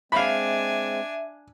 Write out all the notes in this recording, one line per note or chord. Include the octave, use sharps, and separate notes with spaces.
G#3 C4 D4 E5 F5 G#5 B5